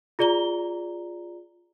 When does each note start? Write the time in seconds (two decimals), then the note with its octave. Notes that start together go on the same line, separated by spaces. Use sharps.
0.19 F4 G#4 D5 A#5 G7